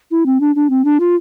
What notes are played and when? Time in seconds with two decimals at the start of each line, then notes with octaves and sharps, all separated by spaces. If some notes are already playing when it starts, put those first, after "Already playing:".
0.11 E4
0.26 C4
0.40 D4
0.55 D4
0.70 C4
0.85 D4
1.00 F4